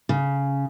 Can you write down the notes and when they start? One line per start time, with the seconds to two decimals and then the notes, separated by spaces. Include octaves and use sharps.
0.09 C#3